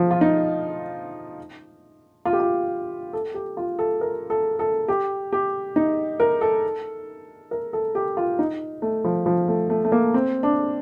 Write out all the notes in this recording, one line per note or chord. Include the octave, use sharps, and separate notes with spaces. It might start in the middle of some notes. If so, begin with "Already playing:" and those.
Already playing: F3
F4
D#4
F4
G4
F4
A4
G4
F4
A4
A#4
A4
A4
G4
G4
D#4
A#4
A4
A#4
A4
G4
F4
D#4
A3
F3
F3
A3
A3
A3
A#3
C4
D4